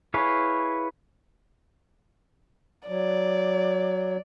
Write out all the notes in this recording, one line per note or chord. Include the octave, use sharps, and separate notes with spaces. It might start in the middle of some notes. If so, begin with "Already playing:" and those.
E4 G#4 B4 C#5 F5
F#3 D5